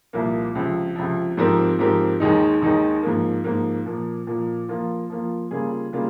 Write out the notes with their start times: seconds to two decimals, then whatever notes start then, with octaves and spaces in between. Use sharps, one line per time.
0.13 C2 A#2 F3 A#3
0.55 C#2 C3 F3
0.96 C#2 C3 F3
1.37 G#2 F3 C4 G4 A#4
1.79 G#2 F3 C4 G4 A#4
2.20 D#2 D#3 G#3 D#4
2.62 D#2 D#3 G#3 D#4
3.03 G#2 F3 A#3
3.44 G#2 F3 A#3
3.86 A#2 F3 A#3
4.27 A#2 F3 A#3
4.69 F3 A#3 F4
5.10 F3 A#3 F4
5.51 C#3 G3 A#3 F4 G#4
5.93 C#3 G3 A#3 F4 G#4